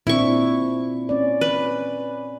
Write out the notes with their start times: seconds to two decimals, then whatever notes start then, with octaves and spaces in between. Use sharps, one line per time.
0.07 A#2 C4 D4 E4 C#6
1.09 C#4 D5
1.41 B4